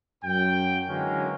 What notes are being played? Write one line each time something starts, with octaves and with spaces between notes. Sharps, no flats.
F#2 G5
D3 E3 F#3 G#3 A#3 C#4